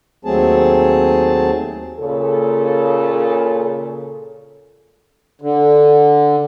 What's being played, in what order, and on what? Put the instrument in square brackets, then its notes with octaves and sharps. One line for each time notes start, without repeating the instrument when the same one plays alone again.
[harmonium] D#2 F#3 A3 C4 G#4 A5
[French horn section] A#2 C#3 A4
[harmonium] D3